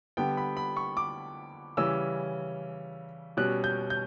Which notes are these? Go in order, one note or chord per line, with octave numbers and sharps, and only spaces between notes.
D3 G3 B3 G5
B5
B5
C#6
D6
C#3 E3 G3 C#4 E6
B2 G3 C#4 F#6
G6
G6